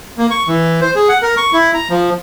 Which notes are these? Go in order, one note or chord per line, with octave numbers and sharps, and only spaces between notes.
A#3
C#6
E3
C5
G#4
F#5
A#4
C#6
E4
A#5
F3